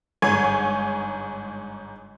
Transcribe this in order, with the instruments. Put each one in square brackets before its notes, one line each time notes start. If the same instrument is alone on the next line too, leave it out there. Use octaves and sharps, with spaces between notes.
[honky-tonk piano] G1 G#2 C#5 G#5 G#6